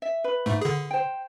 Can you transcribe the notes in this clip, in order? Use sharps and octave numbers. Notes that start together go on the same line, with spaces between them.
E5
B4
G#2 A3
D3 G#4
C5 G5